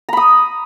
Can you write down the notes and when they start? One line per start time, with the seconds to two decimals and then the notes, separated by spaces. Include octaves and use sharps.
0.09 A#5
0.13 B5
0.17 D#6